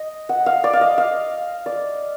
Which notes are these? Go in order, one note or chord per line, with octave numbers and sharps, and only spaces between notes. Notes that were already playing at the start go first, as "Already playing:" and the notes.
Already playing: D#5
F#5
F5
D5
F5
D#5
F5
D5